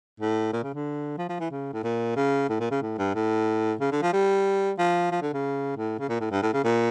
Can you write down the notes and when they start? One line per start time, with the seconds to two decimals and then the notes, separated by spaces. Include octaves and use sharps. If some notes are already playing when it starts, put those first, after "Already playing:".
0.20 A2
0.53 A#2
0.63 C#3
0.74 D3
1.18 F3
1.29 F3
1.40 E3
1.51 C#3
1.73 A2
1.83 A#2
2.16 C#3
2.49 A2
2.60 A#2
2.71 C#3
2.82 A2
2.98 G2
3.15 A2
3.80 C#3
3.92 D3
4.02 F3
4.13 G3
4.78 F3
5.12 F3
5.22 D3
5.33 C#3
5.77 A2
5.99 C#3
6.09 A#2
6.20 A2
6.31 G2
6.42 A2
6.54 C#3
6.64 A#2